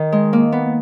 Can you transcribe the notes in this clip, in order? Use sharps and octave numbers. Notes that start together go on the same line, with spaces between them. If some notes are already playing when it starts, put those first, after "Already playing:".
Already playing: D#3
G#3
A#3
B3